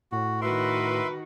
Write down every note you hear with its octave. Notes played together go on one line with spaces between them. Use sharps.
A2 F#4
D#3 F#4 A#4 B4 E5 C6